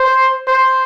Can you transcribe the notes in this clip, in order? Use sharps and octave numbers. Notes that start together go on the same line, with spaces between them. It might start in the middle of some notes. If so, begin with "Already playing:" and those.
Already playing: C5
C5